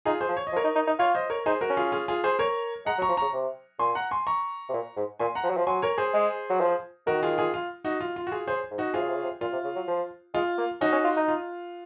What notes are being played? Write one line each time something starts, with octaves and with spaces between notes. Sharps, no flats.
D#4 F4 G#4
G#4 C5
F3
C#5
D#5
F3
A#4 C#5
D#4
D#4
D#4
F4 C#5 F5
C5 D#5
A#4 C#5
D#4 G#4 C5
F#4 A#4
C#4
F4 G#4
F4 G#4
F4 G#4
G#4 C5
A#4 C#5
G#3 F#5 A#5
F#3
A#5 C#6
F3
C#3 A#5 C#6
C3
A#2 G#5 C6
F#5 A#5
G#5 C6
A#5 C#6
C3
A#2
G#2
A#2 G#5 C6
F#5 A#5
F3
F#3
F3
F#3 G#5 C6
A#4 C#5
G#4 C5
G#3
F#3
F3
D#3 F#4 A#4
F4 G#4
F4 G#4
F4
D#4 F#4
F4
F4
F#4
F4 G#4
C#3 G#4 C5
G#2
D#4 F#4
C3 F4 G#4
C#3
C3
C#3
C3
A#2 F4
C3
C#3
F#3
F3
G#3 F4
A#3
C#4 D#4 F#4
C#4
F4
D#4
F4